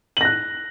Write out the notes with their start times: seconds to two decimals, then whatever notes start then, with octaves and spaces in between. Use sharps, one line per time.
0.17 F#7
0.21 A#6
0.25 F#6